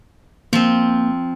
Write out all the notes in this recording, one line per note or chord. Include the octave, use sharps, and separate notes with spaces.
F3 A#3 C4